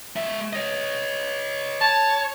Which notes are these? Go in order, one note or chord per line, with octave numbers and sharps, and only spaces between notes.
G#3 E5
C#5 D#5
C#5 A5